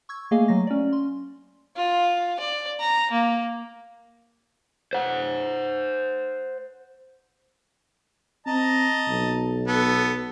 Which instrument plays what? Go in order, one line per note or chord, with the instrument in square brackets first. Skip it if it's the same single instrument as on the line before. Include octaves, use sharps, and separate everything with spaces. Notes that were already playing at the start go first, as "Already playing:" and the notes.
[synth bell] C#6 E6 G#6
A3 A#3 G#4 D#5 F5 G#5
F#3 A#6
C#4 D5
C6
[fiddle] F4
D5
A#5
A#3
[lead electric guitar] C5 F#5
[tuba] C4 [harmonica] D#5 A5 A#5
[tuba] B1
[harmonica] B3 A4